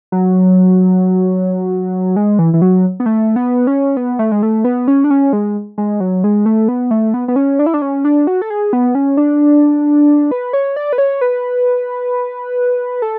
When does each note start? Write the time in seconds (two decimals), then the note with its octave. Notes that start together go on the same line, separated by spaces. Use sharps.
0.12 F#3
2.16 G#3
2.39 E3
2.54 E3
2.62 F#3
3.00 B3
3.06 A3
3.36 B3
3.67 C#4
3.97 B3
4.19 A3
4.32 G#3
4.43 A3
4.64 B3
4.88 C#4
5.04 D4
5.10 C#4
5.33 G#3
5.78 G#3
6.00 F#3
6.24 G#3
6.46 A3
6.68 B3
6.91 A3
7.14 B3
7.28 B3
7.36 C#4
7.59 D4
7.66 E4
7.74 D4
7.82 C#4
8.05 D4
8.27 F#4
8.42 A4
8.50 G#4
8.73 B3
8.95 C#4
9.17 D4
10.31 B4
10.53 C#5
10.76 D5
10.93 B4
10.98 C#5
11.21 B4
13.02 A4